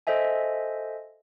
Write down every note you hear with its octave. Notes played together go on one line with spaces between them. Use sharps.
A4 C5 D#5 E5 G#5